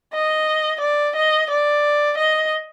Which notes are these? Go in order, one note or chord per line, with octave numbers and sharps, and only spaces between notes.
D#5
D5
D#5
D5
D#5